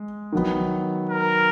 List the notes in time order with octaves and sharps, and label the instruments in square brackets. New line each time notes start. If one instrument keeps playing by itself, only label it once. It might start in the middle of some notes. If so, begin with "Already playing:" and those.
Already playing: [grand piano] G#3
D#3 F#3 B3
[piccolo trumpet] A#4